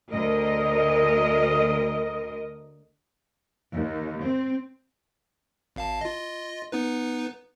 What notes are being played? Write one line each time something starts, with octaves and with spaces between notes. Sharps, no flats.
D2 A#4 D#5
D#2
C4
G#1 F5 A5
F4 D#5
B3 D#4 B4